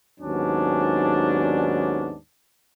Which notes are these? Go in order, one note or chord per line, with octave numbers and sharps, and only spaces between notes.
D#2 G#2 F#3 B3 C#4 D4